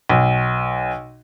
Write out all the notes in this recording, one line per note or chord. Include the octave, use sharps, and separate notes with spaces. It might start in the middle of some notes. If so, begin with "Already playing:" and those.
B1